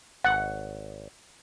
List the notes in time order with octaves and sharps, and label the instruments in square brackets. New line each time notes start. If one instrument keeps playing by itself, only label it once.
[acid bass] G#1 [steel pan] F#5